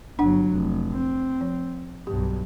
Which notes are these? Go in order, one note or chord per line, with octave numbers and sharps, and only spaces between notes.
G1 F#3 D4 F#5
F1
C4
F3
B1 G2 G4